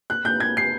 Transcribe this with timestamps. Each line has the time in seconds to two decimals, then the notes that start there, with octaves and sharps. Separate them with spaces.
0.10 F#6
0.25 G6
0.40 G#6
0.57 C7